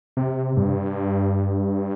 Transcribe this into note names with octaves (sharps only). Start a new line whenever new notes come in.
C3
G2